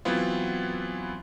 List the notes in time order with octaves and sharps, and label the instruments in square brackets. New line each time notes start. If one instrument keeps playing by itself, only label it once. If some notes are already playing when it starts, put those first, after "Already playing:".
[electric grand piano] E3 F#3 B3 C4 E4 F4